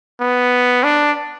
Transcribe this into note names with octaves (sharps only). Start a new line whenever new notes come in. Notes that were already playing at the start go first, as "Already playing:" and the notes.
B3
D4